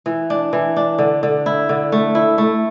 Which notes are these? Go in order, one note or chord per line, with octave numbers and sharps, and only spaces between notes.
E3
D4
E3
D4
D3
D3
E4
D3
A3
E4
A3